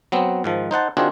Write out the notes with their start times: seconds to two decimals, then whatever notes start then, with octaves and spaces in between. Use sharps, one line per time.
0.12 F#3 B3 C4
0.44 G#2 D#3 F3
0.71 D#4 C5 F#5 A5
0.97 D#3 C4 D4 F4 F#4 G#4